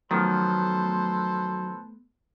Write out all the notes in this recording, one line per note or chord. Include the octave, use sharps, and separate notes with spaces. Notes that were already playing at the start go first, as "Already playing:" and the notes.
D#3 F3 F#3 A3 B3 A4 B4 C5